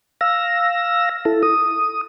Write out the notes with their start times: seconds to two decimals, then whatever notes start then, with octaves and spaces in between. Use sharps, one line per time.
0.21 F5 E6 A#6
1.25 E4 A4
1.43 D#6